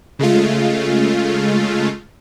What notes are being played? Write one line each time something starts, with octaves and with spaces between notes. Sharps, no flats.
C#3 G#3 A3 F4